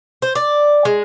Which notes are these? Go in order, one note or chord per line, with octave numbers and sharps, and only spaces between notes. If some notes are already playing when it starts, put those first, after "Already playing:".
C5
D5
G#3